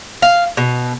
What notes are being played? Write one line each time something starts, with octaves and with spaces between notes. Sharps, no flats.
F5
B2